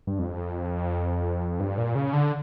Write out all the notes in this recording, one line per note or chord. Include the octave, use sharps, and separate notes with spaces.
G2
F2
G2
A#2
C#3
D3